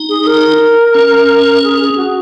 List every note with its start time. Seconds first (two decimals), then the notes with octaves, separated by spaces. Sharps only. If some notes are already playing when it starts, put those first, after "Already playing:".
Already playing: D#4
0.09 G#4
0.23 G#4
0.27 A#4
0.94 C#4
1.64 G#4
1.80 G#4
1.97 F#4